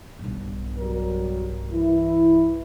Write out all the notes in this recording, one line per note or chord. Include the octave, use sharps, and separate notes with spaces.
B1 G2
F#3 G3 A#4
E3 E4